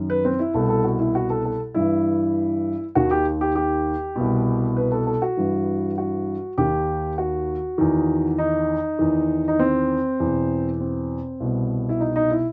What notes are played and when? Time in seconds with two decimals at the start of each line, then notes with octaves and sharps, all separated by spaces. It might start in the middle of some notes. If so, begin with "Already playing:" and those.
Already playing: F#2 D#3
0.10 B4
0.25 C4
0.39 E4
0.54 C2 B2 A4
0.69 A4
0.84 F#4
1.00 E4
1.15 F#4
1.30 A4
1.45 A4
1.74 G2 E3 E4
2.95 D#2 D#3 F#4
3.11 G4
3.41 G4
3.55 G4
4.16 C2 B2
4.77 B4
4.92 A4
5.07 A4
5.22 F#4
5.37 G2 E3
5.98 F#4
6.58 D#2 D#3 G4
7.18 F#4
7.78 E2 D#3
8.38 D#4
8.99 E2 D#3
9.48 D#4
9.59 C4
10.20 E2 B2
10.80 C4
11.40 C2 B2
11.89 E4
12.00 D#4
12.16 D#4
12.31 E4